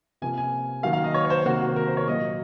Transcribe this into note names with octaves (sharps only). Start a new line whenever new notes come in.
C3 F3 A#3 G#5
G#5
D#3 F#3 A#3 F5
F5
D#5
C#5
C#5
C5
C3 D#3 A#3 F#4
F#4
A#4
C5
C#5
A#2 F#3 A#3 D#5